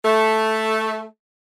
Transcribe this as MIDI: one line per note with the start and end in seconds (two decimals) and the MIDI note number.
0.05 1.06 57